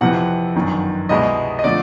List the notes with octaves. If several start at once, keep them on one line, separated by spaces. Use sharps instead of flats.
F2 C3 E3 F#5
G1 F#2 D#3
C2 B2 G#3 D#5
D#5
D3 F3 A3 D5